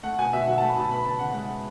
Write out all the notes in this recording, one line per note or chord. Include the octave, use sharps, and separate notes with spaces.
A3 F#5
B2 G#5
B2 E5
F#3 F#5
A5
A3
B5
B2 A5
B3 B5
C#3 A5
C#3 F#5
G#3 F#5
B3